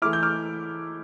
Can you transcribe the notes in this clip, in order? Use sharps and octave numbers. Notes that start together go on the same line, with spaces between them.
E3 A3 E4 D6 F6
G6
D6 F6